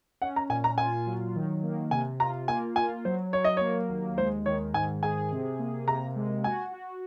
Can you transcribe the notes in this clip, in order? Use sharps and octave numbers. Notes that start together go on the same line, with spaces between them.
C#4 F#5
A#5
A#2 G#5
A#5
F4 G#5
F#3
D#3
A#3
C3 G#5
F4 A#5
A#3 G#5
F4 G#5
F#3 C5
F#3 C#5
D#5
A#3 C#5
D#2
G#3 C5
D#3 C#5
G#2 G#5
G#4 G#5
C3
A#3
C3 A#5
G#3
F#4 G#5
F#4